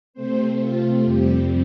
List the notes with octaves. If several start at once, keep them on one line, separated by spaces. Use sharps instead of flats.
C3 A3 C4 C5
F4
F2 C3 G3 C4 G4